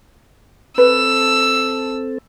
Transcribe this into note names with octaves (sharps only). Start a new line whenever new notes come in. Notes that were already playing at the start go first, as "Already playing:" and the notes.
C4 A4 B4 E6